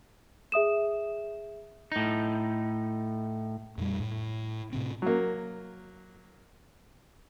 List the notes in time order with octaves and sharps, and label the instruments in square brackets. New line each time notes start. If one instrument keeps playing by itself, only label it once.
[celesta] G#4 E5 D#6 E7
[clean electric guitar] A2 D#4
[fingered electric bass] F2 A#2 G3
A2
A2 C3 C4
[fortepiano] F#3 A#3